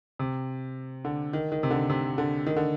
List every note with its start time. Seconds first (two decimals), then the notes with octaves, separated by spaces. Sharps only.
0.19 C3
1.05 D3
1.33 D#3
1.52 D#3
1.63 C3
1.71 D3
1.90 C3
2.18 D3
2.47 D#3
2.56 D3